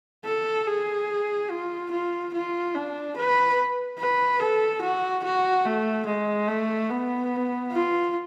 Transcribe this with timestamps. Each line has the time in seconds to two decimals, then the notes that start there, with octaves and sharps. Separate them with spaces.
0.25 A4
0.67 G#4
1.50 F4
1.91 F4
2.33 F4
2.75 D4
3.16 B4
3.99 B4
4.40 A4
4.82 F#4
5.24 F#4
5.65 A3
6.06 G#3
6.48 A3
6.90 B3
7.72 F4